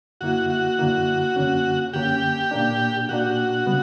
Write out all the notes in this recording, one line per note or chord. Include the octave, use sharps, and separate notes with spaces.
F#2 D3 A#3 E4 F#4
F#4
F#2 D3 A#3 E4
F#2 D3 A#3 C#4
F#2 D3 A#3 C#4 G4
A#2 A#3 D4
A#2 A#3 D4 F#4
C#3 G3 B3